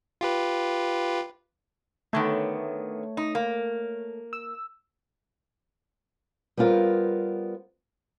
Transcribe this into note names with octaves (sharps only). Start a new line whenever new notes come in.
F4 G4 B4
D3 D#3 A3 B3 C#5
D#4
A#3
E6
G3 B3 C4 F4 A#4